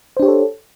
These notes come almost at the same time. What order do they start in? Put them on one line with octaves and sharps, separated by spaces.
C5 D4 G4 C#5 A4